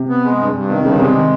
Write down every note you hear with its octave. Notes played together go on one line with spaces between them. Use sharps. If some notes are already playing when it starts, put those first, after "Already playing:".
Already playing: C3
B3
G#3
G2
G2
C3 D#3
G2 C#3
C3 G#3
D#3